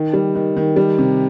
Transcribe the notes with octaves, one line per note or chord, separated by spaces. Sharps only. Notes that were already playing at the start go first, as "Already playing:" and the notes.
Already playing: D#3
G3
D#3
D#3
G3
C3